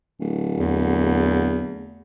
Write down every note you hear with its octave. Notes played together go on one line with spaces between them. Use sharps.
D1
E2